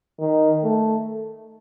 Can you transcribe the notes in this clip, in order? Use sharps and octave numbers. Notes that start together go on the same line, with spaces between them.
D#3
A3